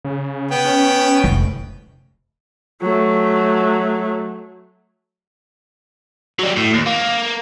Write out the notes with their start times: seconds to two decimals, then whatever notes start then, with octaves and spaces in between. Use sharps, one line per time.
0.04 C#3
0.51 B3 G5
0.65 C#4
1.24 F1
2.82 F#3 A3
6.39 F#3 G3
6.56 A2
6.73 D#2
6.86 A#3